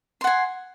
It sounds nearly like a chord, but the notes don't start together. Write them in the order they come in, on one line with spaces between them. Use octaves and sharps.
C6 F#5 G#5